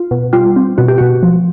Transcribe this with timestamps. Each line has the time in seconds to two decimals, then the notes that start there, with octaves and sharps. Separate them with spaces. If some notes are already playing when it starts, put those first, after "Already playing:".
Already playing: F4
0.11 B2
0.33 G3 F4
0.56 C4
0.78 B2 F#4
0.88 G4
0.98 B2 F#4
1.23 F3